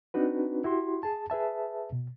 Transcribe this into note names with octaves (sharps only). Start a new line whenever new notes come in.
C4 D4 D#4 F#4 B4
E4 F#4 G4 C6
G#4 A5
G#4 B4 E5 A5
B2